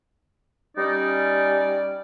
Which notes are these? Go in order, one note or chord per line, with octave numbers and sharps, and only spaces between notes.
G3 C#4 D#4 D5